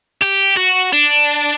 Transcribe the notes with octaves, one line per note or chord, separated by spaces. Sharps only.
G4
F#4
D4